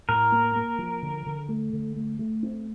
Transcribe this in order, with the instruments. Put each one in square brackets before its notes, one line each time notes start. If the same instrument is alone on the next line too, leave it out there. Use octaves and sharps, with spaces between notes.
[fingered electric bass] A2 [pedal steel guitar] A#4
[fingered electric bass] A#3
A#3
F3
D3
D3
A3
D3
A3
A3
C4